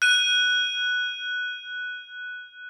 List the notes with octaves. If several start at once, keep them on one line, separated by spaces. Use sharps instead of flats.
F#6 D#7